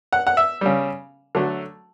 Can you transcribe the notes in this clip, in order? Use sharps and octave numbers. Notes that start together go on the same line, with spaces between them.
F#5
F#5
E5
C#3 G3
D3 F#3 A3